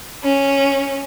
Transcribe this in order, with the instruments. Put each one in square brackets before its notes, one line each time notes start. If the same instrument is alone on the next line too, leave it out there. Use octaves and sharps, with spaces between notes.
[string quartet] C#4